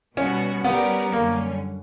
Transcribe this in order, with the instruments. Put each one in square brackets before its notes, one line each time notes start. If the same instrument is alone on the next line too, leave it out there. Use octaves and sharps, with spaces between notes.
[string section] B2 G3 B3 F#4 [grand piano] C#4
[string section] G3 C#4 G4 A#4 D5 [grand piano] B3
[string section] F#2 D3 G3 C#4 [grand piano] A#3